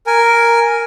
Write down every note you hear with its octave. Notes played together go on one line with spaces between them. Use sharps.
A#4 G#5